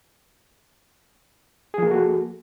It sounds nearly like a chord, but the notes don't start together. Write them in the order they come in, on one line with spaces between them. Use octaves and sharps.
G#4 F3 A#3 A4 F#4